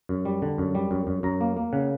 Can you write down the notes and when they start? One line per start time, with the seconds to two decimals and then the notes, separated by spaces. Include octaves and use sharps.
0.09 F#2
0.25 G3
0.42 D3
0.58 F#2
0.75 G3
0.91 F#2
1.07 F#2
1.23 F#2 A#5
1.41 A#3
1.56 A#3
1.73 C#3 F#5